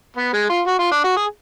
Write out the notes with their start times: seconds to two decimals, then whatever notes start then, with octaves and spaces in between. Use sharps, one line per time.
0.17 B3
0.33 G#3
0.50 F4
0.67 F#4
0.79 F4
0.91 D4
1.04 F#4
1.16 G#4